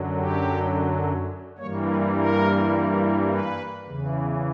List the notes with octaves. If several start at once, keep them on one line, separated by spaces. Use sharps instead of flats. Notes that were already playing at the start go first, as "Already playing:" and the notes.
Already playing: F#2 D3 F#3
G4
G2 E3 G3 A#3 C#5
B4
A#4
B4
E2 C#3 E3